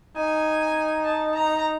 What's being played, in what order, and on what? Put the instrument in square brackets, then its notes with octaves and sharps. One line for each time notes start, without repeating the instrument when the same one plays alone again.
[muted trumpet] D#4 [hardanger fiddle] G#5
[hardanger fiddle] A5
A#5